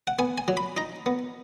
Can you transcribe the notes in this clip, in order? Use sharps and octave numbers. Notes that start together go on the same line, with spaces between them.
F#5
B3 G#5
G#5
F#3
B5
D#4 A#5
B3